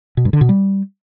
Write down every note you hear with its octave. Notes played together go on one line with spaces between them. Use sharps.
B2
G2
D3
B2
G3